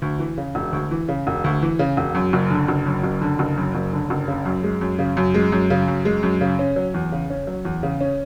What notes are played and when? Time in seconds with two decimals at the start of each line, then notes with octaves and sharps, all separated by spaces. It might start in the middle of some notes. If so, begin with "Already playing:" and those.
0.02 D2
0.19 E3
0.38 C#3
0.55 E1
0.73 D2
0.91 E3
1.09 C#3
1.27 E1
1.44 D2
1.62 E3
1.79 C#3
1.97 E1
2.15 F#2
2.33 F#1
2.50 D3
2.68 F#1
2.86 F#2
3.04 F#1
3.21 D3
3.39 F#1
3.57 F#2
3.75 F#1
3.93 D3
4.10 F#1
4.28 C#3
4.45 F#2
4.63 G#3
4.81 F#2
4.99 C#3
5.17 F#2
5.34 G#3
5.52 F#2
5.70 C#3
5.88 F#2
6.05 G#3
6.23 F#2
6.41 C#3
6.59 C#4
6.76 F#3
6.94 E2
7.12 C#3
7.30 C#4
7.47 F#3
7.65 E2
7.83 C#3
8.01 C#4